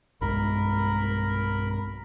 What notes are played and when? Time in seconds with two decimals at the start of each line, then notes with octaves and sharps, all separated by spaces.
0.21 B1 G2 G#3 A#4 B5